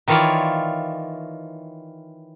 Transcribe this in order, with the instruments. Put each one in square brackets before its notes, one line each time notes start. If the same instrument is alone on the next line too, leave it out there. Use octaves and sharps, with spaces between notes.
[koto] D#3 E3 F4 C#5 D5